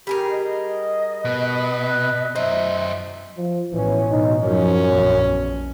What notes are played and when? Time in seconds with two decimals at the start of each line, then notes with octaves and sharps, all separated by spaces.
0.07 G3 G4 G#4 A#4
0.30 D#5
1.25 B2 B4
2.36 F#2 D#4 C5 E5
3.37 F3
3.72 A1 B2 E3 C#4
4.11 B2 D#4
4.42 F#2 F3 F#3 C#4
4.87 A#1 E2